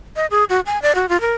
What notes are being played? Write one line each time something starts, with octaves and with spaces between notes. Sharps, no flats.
D#5
G#4
F#4
G#5
D5
F#4
F4
A#4